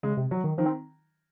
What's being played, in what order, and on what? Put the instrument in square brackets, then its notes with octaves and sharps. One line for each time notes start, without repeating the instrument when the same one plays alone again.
[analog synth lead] C#3 [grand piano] G#3
[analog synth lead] C3
[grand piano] F#3
[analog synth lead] D#3
[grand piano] D#3 [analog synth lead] F3
[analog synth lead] C4